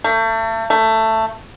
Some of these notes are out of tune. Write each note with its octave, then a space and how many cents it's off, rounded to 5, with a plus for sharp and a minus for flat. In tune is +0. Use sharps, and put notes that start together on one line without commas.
A3 +35
A3 +15